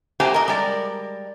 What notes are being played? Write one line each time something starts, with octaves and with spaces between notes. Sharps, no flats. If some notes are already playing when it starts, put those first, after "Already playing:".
A3 A#3 G4 C5 F#5 G#5
A#4 D#5
G3 G#3 A#4 D5